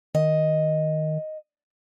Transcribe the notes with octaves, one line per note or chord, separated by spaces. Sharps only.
D#3 D#5